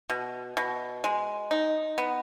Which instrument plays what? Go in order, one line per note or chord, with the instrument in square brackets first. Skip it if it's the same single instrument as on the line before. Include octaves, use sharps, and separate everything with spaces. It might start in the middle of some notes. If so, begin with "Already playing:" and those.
[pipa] B2
B2
G#3
D#4
B3